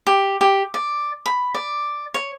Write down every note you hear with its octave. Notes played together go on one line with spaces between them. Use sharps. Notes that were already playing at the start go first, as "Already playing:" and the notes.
G4
G4
D5
B5
D5
C#5